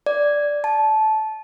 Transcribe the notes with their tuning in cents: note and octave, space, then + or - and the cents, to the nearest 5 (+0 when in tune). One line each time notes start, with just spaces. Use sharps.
D5 -5
A5 -20